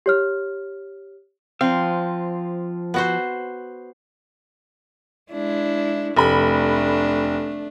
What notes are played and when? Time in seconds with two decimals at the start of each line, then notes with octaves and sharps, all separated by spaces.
0.06 G4 C#5 F6
1.61 F3 C4 F5
2.94 B3 F#4 C5
5.32 G#3 D4 E4
6.17 F1 A3 D4 B5